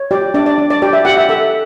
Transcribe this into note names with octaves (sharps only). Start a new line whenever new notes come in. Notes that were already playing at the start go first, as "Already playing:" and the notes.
Already playing: C#5
G4 D5
D4 D5
D5
D4
D5
G4 D5
E5
G4 F#5
E5
A4 E5